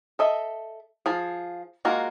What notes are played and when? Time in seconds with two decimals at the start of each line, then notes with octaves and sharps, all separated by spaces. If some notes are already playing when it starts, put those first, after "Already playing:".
0.19 A4 D#5 E5
1.06 F3 G#4
1.85 G#3 A#3 F4 F#4 A#4